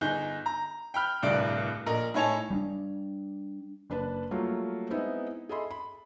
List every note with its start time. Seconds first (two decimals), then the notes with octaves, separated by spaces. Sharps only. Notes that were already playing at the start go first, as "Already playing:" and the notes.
0.01 G1 D#4 G#4 G6
0.46 A#5
0.94 G5 B5 F6 G6
1.23 D1 C2 G2 D5 D7
1.86 A#1 A#4 D#5
2.14 A2 D#4 C#5 G#5 A5 F7
2.50 G3 C4 D4
3.90 F#1 D4 B4 A5
4.31 F#3 G3 A3 A#3 F4
4.90 G#3 B3 C4 D#4 E4
5.49 G#4 A4 D#5 E5 B5 C6
5.71 B5